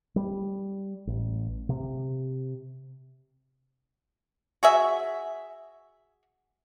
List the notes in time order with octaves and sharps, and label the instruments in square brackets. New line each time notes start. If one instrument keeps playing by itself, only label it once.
[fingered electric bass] G3
A1
C3
[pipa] F#4 G#4 E5